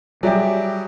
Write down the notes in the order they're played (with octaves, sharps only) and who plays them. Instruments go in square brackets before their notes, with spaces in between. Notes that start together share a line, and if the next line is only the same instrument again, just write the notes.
[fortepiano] F#3 [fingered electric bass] G3 [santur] G4 G#4 [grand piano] D5 E5